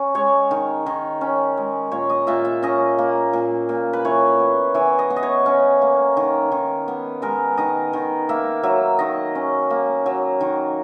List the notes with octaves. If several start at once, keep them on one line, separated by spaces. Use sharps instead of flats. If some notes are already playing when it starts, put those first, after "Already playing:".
Already playing: C#4
G#3 C#5
D#3
D#3
C#4
G#3
A#2 C#5
D#5
A#2 E5
E5
C#4 D#5
A#3
A#2
A#2
B4
E3 C#5
B3
E3 C#5
D#5
B3
D#5
C#5
C#4 C#5
A#3
D#3
D#3
B3
G#3 A#4
D#3 D#5
D#3
A#3 E5
F#3 E5
D#3 D#5
C#4
A#3
F#3
D#3